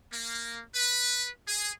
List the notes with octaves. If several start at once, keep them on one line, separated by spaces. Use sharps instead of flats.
A#3
B4
G#4